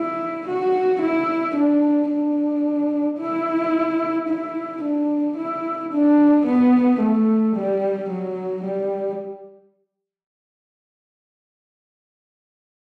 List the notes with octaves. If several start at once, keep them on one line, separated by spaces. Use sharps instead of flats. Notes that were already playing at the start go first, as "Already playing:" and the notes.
Already playing: E4
F#4
E4
D4
D4
E4
E4
D4
E4
D4
B3
A3
G3
F#3
G3